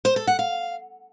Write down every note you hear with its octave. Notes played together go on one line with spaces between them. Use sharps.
C5
A4
F#5
F5